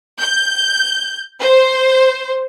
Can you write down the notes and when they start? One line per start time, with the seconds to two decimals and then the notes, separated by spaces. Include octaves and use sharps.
0.19 G6
1.41 C5